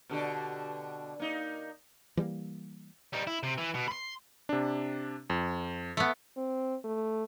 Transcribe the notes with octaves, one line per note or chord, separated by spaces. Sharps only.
B2 D3 G4
A#3 D#4
E3 G3 G#3 A#3
G3 D#4
E4
C3
E3
B2
B5 C6
C3 D4
F2
A3 B3
C4
A3